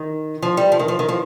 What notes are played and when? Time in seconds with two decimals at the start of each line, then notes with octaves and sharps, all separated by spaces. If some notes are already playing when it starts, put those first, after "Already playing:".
Already playing: D#3
0.42 F3
0.57 G3
0.72 F3
0.79 D#3
0.88 F3
0.99 D#3
1.09 F3